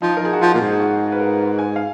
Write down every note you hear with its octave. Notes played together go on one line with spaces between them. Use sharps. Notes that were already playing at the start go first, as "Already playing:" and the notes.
F3 D#4
A#4
F3 G#4
F#4
F3 F4
A#2
G#2
F#4
B4
A#4
G#5
F5